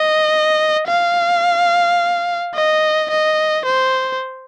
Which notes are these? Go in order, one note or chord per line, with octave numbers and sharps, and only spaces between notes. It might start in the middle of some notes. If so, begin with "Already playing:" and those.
Already playing: D#5
F5
D#5
D#5
C5